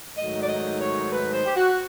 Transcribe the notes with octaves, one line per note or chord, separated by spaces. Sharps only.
G#2 D#3 F#3 A3 D#5
D5
D#5
C#5
B4
C5
G4
F#4